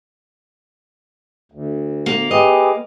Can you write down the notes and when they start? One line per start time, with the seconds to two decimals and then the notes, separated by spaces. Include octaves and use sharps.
1.52 D2
2.06 A#3
2.31 G4 G#4 B4 D#5